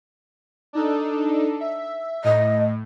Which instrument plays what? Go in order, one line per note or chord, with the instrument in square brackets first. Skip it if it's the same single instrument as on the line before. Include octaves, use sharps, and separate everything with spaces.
[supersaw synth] D4 D#4 A4
E5
[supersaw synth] A2 [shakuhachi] D#5